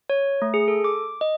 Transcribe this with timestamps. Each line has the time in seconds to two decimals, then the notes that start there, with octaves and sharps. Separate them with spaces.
0.10 C#5
0.42 A3
0.54 G#4
0.68 A4
0.84 D6
1.21 D#5